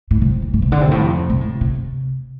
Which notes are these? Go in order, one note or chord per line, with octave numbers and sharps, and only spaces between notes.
A2
C3
A2
A2
C3
D3
C3
G2
A2
F2
C3
A2
C3